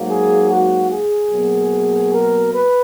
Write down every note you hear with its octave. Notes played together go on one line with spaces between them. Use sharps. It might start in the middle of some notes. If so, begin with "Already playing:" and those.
Already playing: G#2 F#3 A#3
G#4
F#4
G#4
B2 F#3 A#3
A#4
B4